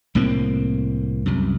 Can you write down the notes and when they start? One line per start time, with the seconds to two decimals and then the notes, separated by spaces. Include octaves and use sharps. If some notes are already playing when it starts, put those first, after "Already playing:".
0.15 C2 A2 A#3 C4
1.26 C2 F#2